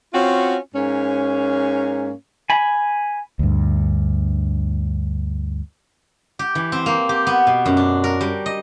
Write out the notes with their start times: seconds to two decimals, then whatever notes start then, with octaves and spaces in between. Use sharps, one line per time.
0.13 C4 C#4 F4 F#4
0.75 G#2 A#3 C#4
2.50 G#5 B5
3.39 D2 G2
6.39 G4
6.55 E3
6.72 C4
6.86 A#3
7.09 G4
7.27 B3
7.47 B2
7.65 F#2
7.77 D4
8.04 A#4
8.21 G3
8.46 D#5